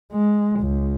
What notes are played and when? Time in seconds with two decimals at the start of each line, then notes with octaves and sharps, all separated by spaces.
0.12 G#3
0.60 C#2